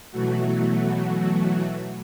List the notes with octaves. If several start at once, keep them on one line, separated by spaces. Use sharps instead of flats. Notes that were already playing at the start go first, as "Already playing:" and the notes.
B2 E3 F#3 A3 F#4